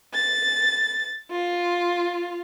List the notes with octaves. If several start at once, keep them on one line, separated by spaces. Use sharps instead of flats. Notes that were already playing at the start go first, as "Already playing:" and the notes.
A6
F4